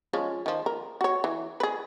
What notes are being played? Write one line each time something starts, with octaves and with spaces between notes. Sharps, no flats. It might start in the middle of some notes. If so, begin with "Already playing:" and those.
F3 G#3 C#4
D#3 F3
A#4
F#4 C#5
E3
G#4 B4